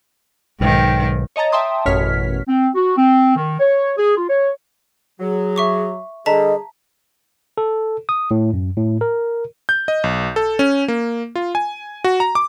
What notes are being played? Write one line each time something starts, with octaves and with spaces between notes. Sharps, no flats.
B1 G#2 D#3 G5
C#5 D#5 A5 A#5 A6
E5 G5 A5 C6 D#6
A1 F#2 B2 C#5 F6 B6
C4
F#4
C4
D#3
C#5
G#4
F4
C#5
F#3 G#4
E5 C#6 D6
D3 G3 G#4 D#5 A5 A#5 B6
A4
D#6
A2
F#2
A2
A#4
G6
D#5
B1
A4
C#4
A#3
F4
G#5
F#4
A#5
D6